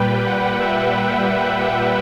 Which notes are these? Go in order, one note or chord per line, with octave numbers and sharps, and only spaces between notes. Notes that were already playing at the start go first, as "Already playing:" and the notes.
Already playing: A#2 G3 B4 G5
F#5
E5
F#5
E5